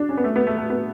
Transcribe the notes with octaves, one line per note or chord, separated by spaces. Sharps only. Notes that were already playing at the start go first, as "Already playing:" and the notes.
Already playing: D4
C#4
B3
A3
B3
A3
A3
B3